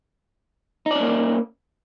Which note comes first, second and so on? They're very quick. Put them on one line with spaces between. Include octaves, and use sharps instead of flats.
D#4 D5 C#4 A#3